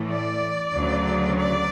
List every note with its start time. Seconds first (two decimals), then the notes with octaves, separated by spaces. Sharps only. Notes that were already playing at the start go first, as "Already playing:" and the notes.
Already playing: A2 E3 A3
0.09 D5
0.73 D2 C#3 F#3
1.39 D5